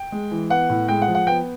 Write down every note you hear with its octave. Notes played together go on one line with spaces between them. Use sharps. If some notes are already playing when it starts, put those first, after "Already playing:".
Already playing: G5
G#3
E3
B3 F#5
A2
G#3 G5
F#5
F3
F#5
B3 G5